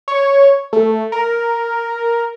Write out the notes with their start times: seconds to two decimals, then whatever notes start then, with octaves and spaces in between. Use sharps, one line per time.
0.08 C#5
0.73 A3
1.12 A#4